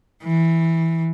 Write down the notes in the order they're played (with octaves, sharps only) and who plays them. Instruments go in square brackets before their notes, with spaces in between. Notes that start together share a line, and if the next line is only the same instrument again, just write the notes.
[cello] E3